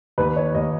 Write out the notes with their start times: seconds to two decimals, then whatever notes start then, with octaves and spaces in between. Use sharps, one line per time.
0.18 D#2 B4
0.36 C#5
0.54 D#2 D#5